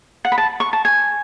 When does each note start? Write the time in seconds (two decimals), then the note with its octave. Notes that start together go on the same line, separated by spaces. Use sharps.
0.25 F#5
0.32 B5
0.38 A5
0.60 C#6
0.73 A5
0.85 G#5